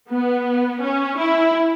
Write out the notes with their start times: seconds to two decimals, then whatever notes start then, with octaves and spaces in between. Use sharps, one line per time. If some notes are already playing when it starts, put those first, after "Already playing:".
0.09 B3
0.82 C#4
1.17 E4